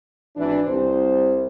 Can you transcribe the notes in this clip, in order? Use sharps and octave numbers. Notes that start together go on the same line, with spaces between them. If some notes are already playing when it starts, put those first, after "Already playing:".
G#1 E3 D4
C2 C5